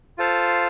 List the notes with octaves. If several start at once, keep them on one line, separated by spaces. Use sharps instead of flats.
F4 A4 C5 F5